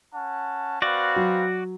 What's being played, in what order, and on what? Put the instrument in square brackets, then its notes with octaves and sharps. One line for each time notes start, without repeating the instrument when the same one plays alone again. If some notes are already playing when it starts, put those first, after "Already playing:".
[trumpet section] C#4 F#5 A5
[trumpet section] C4 B4 F5 [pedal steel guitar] F#4 D5
[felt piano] F#3